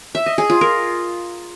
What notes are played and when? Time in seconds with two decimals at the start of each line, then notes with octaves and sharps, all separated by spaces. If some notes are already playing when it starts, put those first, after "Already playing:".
0.15 E5
0.26 D#5
0.38 G#4
0.50 F4
0.61 A#4